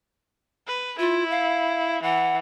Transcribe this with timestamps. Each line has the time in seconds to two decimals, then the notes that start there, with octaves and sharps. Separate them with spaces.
0.68 B4
0.99 E4 F4
1.30 F5
2.03 E3 F#5